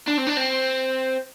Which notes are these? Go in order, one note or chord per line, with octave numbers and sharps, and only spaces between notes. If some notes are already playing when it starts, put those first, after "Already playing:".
D4
C4
D4
C4